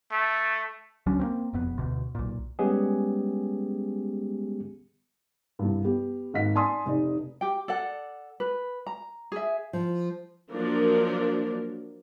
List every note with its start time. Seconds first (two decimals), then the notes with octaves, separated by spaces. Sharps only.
0.12 A3
1.06 D2 F#3 C#4 D4
1.19 A#3 C4
1.53 E1 F2 B3
1.78 D2 B2
2.15 B1 A#2
2.59 G3 G#3 B3 C#4 G4 G#4
5.59 C2 G2
5.84 B3 G4
6.34 G#1 D#5 F#5 B6
6.55 D5 G#5 A5 C6 D#6
6.86 F1 D#4 D5
7.41 G4 G5
7.68 A4 D5 F#5
8.40 B4
8.87 A#5
9.32 G#4 E5
9.73 F3
10.51 F3 F#3 A#3 D4 A#4